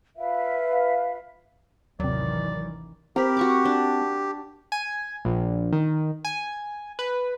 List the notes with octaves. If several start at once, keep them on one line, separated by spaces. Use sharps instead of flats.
F4 B4 E5 F5
A1 D#2 C3 D#3 E3 F#3 D5
C4 G4 A#4 B5
F#4 C#6 D6
D4
G#5
A#1
D#3
G#5
B4